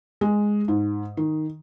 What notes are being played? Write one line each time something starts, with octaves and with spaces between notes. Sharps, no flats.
G#3
G#2
D#3